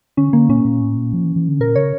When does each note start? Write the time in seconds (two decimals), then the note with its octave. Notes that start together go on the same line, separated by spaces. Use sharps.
0.17 D3 C#4
0.33 D3 A#3
0.49 A#2 C#4
0.65 A#2
0.81 A2
0.96 A#2
1.13 F3
1.24 E3
1.36 E3
1.49 D3
1.60 A#2 A#4
1.75 C#3 C#5